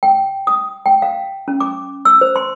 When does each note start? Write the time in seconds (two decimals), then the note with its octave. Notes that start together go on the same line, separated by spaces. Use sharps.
0.03 G5
0.47 D#6
0.86 G5
1.02 F5
1.48 C#4
1.60 D6
2.05 E6
2.21 C5
2.36 C6